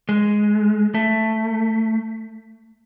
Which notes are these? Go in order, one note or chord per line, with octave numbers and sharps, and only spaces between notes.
G#3
A3